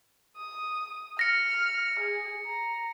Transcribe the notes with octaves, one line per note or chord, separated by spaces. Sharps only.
D#6
F6 A#6 C#7
G#4
A#5